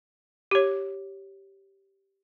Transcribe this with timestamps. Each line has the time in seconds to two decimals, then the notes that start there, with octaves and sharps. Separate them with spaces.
0.51 G4 C#5